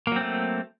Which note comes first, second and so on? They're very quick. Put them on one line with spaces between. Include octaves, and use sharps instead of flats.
A#3 F#3 C4 A3